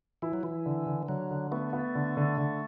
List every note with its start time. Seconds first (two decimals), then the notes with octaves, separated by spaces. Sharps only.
0.22 E3 E4
0.33 F#3
0.43 E3 E4
0.66 D3
0.87 D3
1.08 D3 F#3
1.31 D3
1.51 A3 B3
1.73 B3
1.95 D3
2.17 D3
2.38 D3